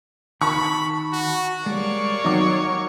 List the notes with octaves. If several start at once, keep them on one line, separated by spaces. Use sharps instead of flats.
D#3 A5 B5 C#6
F#4
G3 G#3 A#3 C#5 D5
D#3 F#3 D#5 D6